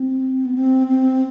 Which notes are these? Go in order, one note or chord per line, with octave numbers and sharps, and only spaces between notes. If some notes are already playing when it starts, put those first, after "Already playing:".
Already playing: C4
B3
C4
C4